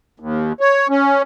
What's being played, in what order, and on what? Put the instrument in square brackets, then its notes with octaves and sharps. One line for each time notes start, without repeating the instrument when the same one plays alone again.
[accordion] D#2
C#5
C#4